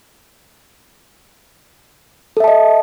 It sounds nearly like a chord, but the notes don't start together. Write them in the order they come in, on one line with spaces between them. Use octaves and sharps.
A4 E5 A5 D#5